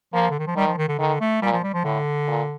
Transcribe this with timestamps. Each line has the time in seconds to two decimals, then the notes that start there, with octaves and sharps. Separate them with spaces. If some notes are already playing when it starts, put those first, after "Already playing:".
0.13 F3 A#3
0.30 D3
0.39 D#3
0.47 F3
0.56 D#3 G3
0.67 F3
0.78 D#3
0.88 D3
0.99 D3 D#3
1.20 A3
1.42 A#2 G3
1.52 F3
1.63 G3
1.74 F3
1.84 A2 D3
2.27 A#2